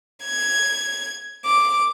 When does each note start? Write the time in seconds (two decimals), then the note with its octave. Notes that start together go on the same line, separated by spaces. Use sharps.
0.24 G#6
1.46 D6